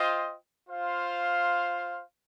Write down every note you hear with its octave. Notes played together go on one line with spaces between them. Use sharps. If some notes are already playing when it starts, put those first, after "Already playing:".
Already playing: F4 C5 D#5 G5
F4 C5 F5